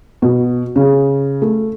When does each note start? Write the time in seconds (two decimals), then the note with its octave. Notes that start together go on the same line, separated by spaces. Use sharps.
0.22 B2
0.76 C#3
1.42 A3